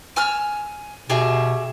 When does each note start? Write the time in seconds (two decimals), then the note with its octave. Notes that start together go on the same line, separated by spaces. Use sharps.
0.16 G#5 E6 F6
1.10 B2 G4 G#4 E5